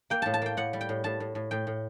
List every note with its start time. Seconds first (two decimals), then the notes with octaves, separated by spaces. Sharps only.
0.10 A#3 G5
0.22 A2 A5
0.34 A5
0.42 A#3 G5
0.57 A2 F#5
0.73 G3
0.81 G5
0.89 A2
1.04 A2 A5
1.20 A2
1.35 A2
1.51 A2 G5
1.67 A2